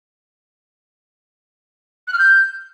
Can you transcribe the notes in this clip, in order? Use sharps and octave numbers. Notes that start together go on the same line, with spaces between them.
F#6
F6
G6